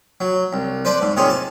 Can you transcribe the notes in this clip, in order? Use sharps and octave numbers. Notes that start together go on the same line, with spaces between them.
F#3
C2
B4 C5 D5 A5
G#2
C3 D#3 F4 G#4 C#5
A5